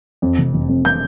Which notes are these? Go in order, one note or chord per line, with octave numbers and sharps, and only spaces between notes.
F2
F1
F1
F2
C3 G6